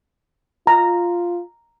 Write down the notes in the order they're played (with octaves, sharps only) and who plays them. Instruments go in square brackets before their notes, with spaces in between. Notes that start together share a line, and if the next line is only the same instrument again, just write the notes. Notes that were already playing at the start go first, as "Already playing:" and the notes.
[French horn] F4 [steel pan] A#5